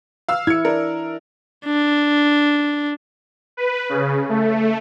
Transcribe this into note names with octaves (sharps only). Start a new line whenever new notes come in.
F5 E6 F6
E4 G#6 C#7
D4 A#4
D4
B4
C#3
A3